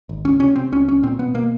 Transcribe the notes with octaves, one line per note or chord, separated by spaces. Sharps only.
G#1
C#2 C#4
C3 C#4
C3 C4
C#2 C#4
C2 C#4
A#2 C4
B2 B3
B2 A#3